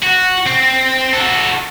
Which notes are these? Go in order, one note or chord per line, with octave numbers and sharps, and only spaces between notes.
F#4
C4
F#4 A4